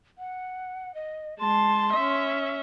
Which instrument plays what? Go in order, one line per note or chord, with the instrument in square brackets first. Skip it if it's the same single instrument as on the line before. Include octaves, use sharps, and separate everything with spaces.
[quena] F#5
D#5
[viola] G#3 A5 [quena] C6
[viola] C#4 E5